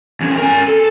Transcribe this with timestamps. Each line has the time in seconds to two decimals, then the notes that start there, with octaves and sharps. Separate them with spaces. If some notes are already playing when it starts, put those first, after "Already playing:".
0.21 E2 C#4
0.38 A#4 G#5
0.68 A4